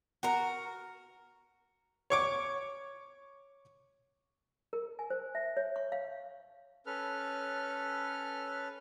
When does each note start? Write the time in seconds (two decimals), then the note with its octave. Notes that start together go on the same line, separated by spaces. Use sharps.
0.23 F#4 A#4
2.10 C#5 C#6 D6
4.73 A#4
4.99 G#5
5.10 C5
5.35 E5
5.57 C#5
5.76 C#6
5.92 F5
6.86 C#4 A4 B4 F6